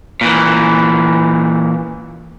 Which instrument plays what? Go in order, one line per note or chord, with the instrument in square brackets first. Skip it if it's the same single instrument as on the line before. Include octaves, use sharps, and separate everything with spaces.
[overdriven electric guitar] A#2 E3